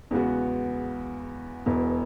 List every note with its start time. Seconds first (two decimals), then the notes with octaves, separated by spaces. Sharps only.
0.11 E2 C#3 G#3 B3 F#4
1.66 E1 E2 B2